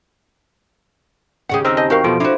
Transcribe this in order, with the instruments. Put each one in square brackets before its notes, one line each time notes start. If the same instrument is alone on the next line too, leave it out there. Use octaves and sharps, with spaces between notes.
[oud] D#2 C#3 G4 [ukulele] G#4 F#5
[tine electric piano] C4 D#4 [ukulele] D#5 [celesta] G5 E6 F6
[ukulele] D#5 [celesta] A5 G6
[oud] E2 [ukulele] F#4 A#4 F5 [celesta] G5 C#6 G6
[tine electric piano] B2 F3 [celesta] A4 C6 D7
[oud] F3 [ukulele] D4 F#4 [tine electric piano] E4